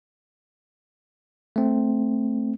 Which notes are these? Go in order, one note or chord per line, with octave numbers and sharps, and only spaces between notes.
A3 C4